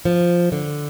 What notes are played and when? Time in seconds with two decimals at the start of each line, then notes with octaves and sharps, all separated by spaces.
0.05 F3
0.52 D3